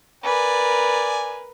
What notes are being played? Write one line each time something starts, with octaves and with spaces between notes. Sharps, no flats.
A#4 B4 D5 G#5